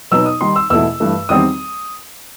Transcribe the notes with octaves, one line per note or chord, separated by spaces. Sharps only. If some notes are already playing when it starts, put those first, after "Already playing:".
B2 F#3 B3 D#4 E6
D#6
D#3 G3 D#4 C6
E6
E2 B2 A3 E4 E6
G2 E3 A3
E2 D#3 G3 C4 D#6